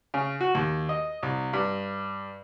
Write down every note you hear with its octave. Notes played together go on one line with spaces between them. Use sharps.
C#3
F#4
D#2
D#5
C2
G2